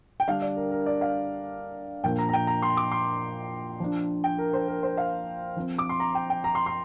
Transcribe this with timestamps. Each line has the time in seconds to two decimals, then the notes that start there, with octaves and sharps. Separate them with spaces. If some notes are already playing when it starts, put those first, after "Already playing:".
0.20 G5
0.27 D3 G3 D4 F5
0.42 D5
0.57 A#4
0.71 A#4
0.86 D5
1.01 F5
2.04 A#2 F3 A#3 D4 G5
2.18 A#5
2.29 A#5
2.33 G5
2.47 A#5
2.62 C6
2.77 D6
2.92 C6
3.80 F3 D4
4.24 G5
4.38 A#4
4.53 C5
4.68 A#4
4.83 C5
4.97 F5
5.56 F3 C4
5.78 D6
5.89 C6
6.00 A#5
6.15 G5
6.30 G5
6.44 A#5
6.55 C6
6.66 C6